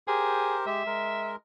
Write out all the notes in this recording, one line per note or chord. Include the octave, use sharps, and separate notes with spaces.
G4 G#4 A#4 C5
G#3 G4 E5
G#3 A#4